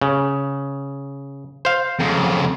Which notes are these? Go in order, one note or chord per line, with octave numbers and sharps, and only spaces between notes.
C#3
C5 F5
F2 C#3